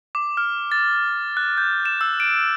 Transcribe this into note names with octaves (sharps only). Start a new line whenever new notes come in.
D6
F6
A6
F#6
G6
E7
E6
D7